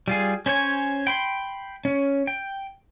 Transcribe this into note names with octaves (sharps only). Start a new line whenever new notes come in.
G3 F4 G#4
C#4 C5 C#5 G#5
G5 B5 C6
C#4
G5